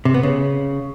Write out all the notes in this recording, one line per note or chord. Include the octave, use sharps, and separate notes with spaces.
C3
B3
C#3